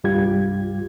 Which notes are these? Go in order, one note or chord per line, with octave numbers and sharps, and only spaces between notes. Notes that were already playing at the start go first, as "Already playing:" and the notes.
C2 G2 G3 F4 G4 G#6